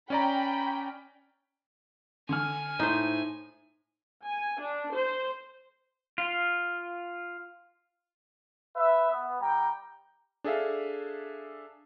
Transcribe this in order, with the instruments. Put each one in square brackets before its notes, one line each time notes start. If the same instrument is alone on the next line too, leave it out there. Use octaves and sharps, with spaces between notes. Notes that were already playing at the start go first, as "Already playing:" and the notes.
[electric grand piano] C#4 D5 A#5 [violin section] G5 B5
[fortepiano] D3 F6 [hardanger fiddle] G#5
[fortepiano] A2 [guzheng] D#4 C5
[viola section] G#5
D4
C5
[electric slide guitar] F4
[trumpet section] B4 E5
B3
G3 G5 A#5
[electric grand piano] D4 G#4 A4 E5 F5